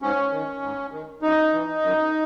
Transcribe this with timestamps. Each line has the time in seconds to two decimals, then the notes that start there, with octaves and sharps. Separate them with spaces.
0.02 G#2 C#4
0.32 D#3
0.62 G#2
0.92 D#3
1.22 F#2 D#4
1.53 E3
1.83 F#2